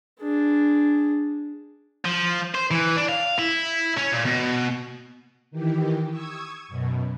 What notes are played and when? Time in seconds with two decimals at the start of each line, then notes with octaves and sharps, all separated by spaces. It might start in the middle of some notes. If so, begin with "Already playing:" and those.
0.21 D4 G#4
2.05 F3
2.54 C5
2.71 E3
2.96 D4
3.09 F5
3.39 E4
3.97 C#4
4.12 A#2
4.25 B2
5.51 D#3 E3 G4
6.09 C#6 D#6 E6 G#6
6.68 F#2 B2